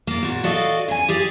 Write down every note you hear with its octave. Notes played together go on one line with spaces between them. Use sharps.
A#3 D5
A#2 F#4
F#4 A4 D5 D#5 F5
C#3 G#5
G4 G#4 D5